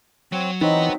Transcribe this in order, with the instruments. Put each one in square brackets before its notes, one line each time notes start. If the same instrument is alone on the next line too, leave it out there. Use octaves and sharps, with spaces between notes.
[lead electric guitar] F#3 [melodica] C4 C#5
[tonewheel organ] E3 [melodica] F#3 C4 F#4 [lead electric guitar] B3 B4 [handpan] D#4